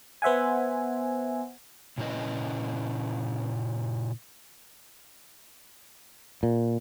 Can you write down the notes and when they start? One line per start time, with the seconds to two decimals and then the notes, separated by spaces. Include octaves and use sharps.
0.22 B3 C5 E5 F#5 G#5
1.98 A#2 C#3 C#4 E4 B4 D#5
6.43 A#2